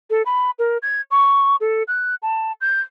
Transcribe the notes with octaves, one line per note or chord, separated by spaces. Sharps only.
A4
B5
A#4
G#6
C#6
A4
F#6
A5
G6